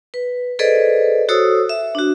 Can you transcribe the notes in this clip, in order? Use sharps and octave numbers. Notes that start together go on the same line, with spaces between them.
B4
G#4 A4 B4 C5 D5 D#5
F#4 A4 C5 C#5 D#6 E6
E5
D4 F#4